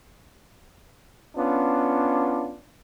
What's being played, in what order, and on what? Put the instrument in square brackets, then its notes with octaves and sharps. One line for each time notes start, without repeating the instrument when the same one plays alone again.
[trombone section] B3 C#4 D4 F4